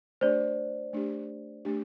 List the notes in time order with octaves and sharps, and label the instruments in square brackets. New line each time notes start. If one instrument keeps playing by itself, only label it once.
[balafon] A3 D4 G4 [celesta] C5 D5
[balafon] A3 D4 G4
A3 D4 G4